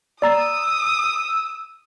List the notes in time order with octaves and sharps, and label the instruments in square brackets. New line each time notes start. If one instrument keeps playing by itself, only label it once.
[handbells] D5 A#5 A6 [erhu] D#6 [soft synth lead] E6